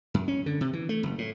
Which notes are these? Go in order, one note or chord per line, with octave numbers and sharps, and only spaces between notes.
F#2
C#4
D3
C3
E3
A3
F#1
A2